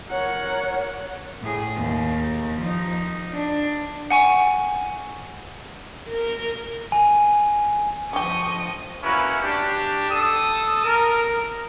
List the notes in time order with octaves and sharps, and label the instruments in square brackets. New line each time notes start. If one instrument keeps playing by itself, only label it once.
[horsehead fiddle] A#4 F#5 [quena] C#5
[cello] A2 G#4
D#2
F3 D#4
D4
[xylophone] F#5 G#5 C#6
[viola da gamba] A#4
[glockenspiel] G#5
[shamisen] D3 G4 [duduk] F3 [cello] D#5 [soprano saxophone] C#6
[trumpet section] A#3 C#4 E4 F#4 B4
D4 G4
A4 A5 D#6
A#4